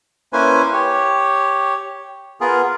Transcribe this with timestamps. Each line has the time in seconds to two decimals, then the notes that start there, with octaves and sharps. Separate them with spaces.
0.33 A#3 C#4 E4 B4 C5 G#5
0.73 G4 C#5
2.41 B3 F4 G#4 A#4